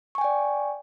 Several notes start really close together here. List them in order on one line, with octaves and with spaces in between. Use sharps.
C#6 G#5 G5 D5